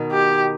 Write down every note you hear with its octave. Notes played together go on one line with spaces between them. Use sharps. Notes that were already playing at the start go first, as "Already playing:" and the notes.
Already playing: B2 D#3
G4